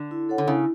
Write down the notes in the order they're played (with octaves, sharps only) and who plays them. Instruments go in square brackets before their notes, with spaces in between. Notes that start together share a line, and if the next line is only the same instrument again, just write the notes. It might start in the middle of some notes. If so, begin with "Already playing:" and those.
Already playing: [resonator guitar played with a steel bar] D3
[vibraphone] E4
A4 C#5 F#5
[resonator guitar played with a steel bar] D3
[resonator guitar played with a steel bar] C#3 [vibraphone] E4